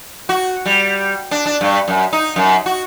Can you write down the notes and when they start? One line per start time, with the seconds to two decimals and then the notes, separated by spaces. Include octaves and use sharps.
0.29 F#4
0.66 G3
1.31 D4
1.46 D4
1.61 G2
1.88 F#2
2.13 D#4
2.36 F#2
2.66 F#4